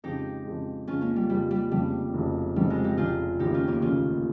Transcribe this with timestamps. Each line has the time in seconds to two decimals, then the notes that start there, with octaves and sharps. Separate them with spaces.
0.04 F2 C#3 G#3 D#4 G4
0.45 F2 C#3 G#3
0.87 F2 C#3 G#3 C#4 F4
1.01 A#3 C#4
1.16 G3
1.30 F2 C#3 G3 G#3
1.51 G3
1.71 F1 F2 C#3 G3
2.13 F1 F2 C#3
2.56 F1 F2 C#3 G3
2.70 F3 G#3
2.84 D#4 G4
2.97 F1 F2 C#3 F4 G#4
3.39 F1 D#2 C#3 D#4 G4
3.54 C#4 F4
3.68 A#3 C#4
3.82 F1 D#2 C#3 C#4 F4